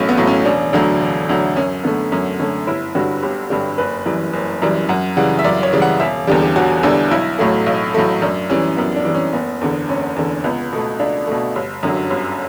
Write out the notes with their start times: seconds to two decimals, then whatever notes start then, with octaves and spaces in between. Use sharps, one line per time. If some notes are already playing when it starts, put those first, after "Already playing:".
Already playing: B1 A2 F#3 A3 C#4
0.09 B3
0.17 A2 F#3 A3
0.27 C#4
0.45 E1 D4
0.73 D2 D3 F#3 D4
1.01 E1
1.29 D2 D3 F#3
1.56 F#2 C#4
1.84 D3 A3 B3
2.12 F#2 C#4
2.40 D3 A3 C#4
2.67 G1 E4
2.95 G2 D3 G3 F#4
3.23 G1 G4
3.50 G2 D3 G3 G4
3.78 F#1 B4
4.06 F#2 E3 G3
4.33 F#1
4.62 F#2 E3 G3
4.89 F#2 F#5
5.17 C#3 E3 G3 F#5
5.39 E5
5.44 F#2 D5
5.63 C#5
5.73 C#3 E3 G3
5.82 F#5
6.00 E1 E5
6.27 E2 D3 G3 G4
6.42 G4
6.56 E1 F#4
6.83 E2 D3 G3 E4
7.11 B1 E4
7.39 A2 F#3 A3
7.66 B1
7.94 A2 F#3 A3
8.22 F#2 D4
8.50 E3 G3 C#4
8.77 F#2 B3
8.96 D4
9.05 E3 G3
9.15 C#4
9.33 F#1 B3
9.61 E2 D3
9.89 F#1 C#4
10.16 E2 D3
10.44 C#2 B3
10.73 B2 A3
10.99 C#2 D4
11.27 B2 A3
11.56 G1
11.83 F#2 D3 F#3
12.10 G1